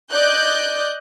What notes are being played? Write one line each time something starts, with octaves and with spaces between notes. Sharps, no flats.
D5 D#5 F#6 G6